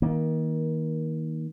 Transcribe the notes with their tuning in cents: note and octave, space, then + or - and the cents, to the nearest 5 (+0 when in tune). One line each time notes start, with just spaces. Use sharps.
D#3 +25 A#3 +20